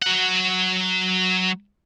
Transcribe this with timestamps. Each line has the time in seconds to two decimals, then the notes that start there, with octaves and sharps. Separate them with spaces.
0.02 F#3 F#5